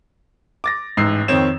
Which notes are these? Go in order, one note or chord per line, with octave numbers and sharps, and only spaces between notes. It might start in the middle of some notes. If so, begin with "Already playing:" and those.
D6 A6 A#6
A1 G#2 E6 C7
F2 D#3 C4 C#5 E7